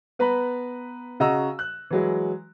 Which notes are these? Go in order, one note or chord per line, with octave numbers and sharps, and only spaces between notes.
B3 B4 A#5 B5
C#3 F#4 D#5 A#5 E6
F#6
E3 F#3 G#3